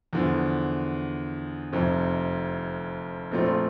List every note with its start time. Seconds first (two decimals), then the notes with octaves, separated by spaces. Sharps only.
0.13 E2 D3 F3
1.72 F1 F2 C3 F3
3.32 A#1 A#2 A3 C4 F4